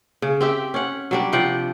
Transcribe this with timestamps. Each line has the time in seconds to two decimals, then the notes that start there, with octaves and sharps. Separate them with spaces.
0.22 C#3
0.41 C4 G4 E5
0.74 C#4 F#5
1.11 F#3 G3 D4
1.32 C3 F3 F#5 G5